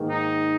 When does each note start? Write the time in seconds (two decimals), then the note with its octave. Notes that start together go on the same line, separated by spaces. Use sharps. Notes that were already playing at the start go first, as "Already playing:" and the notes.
Already playing: G#2 D#3 A#3
0.10 D#4